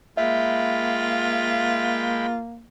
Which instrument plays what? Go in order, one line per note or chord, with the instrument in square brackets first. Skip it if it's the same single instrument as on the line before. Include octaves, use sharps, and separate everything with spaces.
[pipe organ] G#3 G5 B5 [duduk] A#3 [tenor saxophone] F4 [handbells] E5